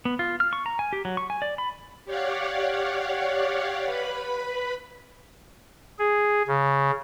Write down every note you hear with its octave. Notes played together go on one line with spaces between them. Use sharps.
B3
F4
F6
C#6
A#5
G#5
G4
F#3
C#6
G#5
D5
B5
G4 C#5 D5 F5 F#5
B4 B5
G#4
C#3